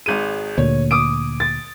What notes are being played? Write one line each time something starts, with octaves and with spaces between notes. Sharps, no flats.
G#1 G#3 D#7
D2 A#2 C#5
D6 D#6 D7
A6